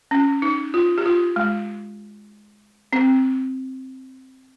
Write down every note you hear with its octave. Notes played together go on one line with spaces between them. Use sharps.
C#4
D#4
F4
G4
F4
G#3
C4